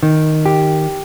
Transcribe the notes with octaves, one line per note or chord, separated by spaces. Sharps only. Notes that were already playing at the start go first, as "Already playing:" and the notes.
D#3
G4